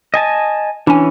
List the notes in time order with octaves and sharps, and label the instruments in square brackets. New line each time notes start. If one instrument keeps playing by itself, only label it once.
[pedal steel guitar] D#5 G#5 A5
[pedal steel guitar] E3 C#4 [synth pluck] D4 G#5